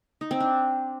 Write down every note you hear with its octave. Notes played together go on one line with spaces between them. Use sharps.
D#4
C4
D4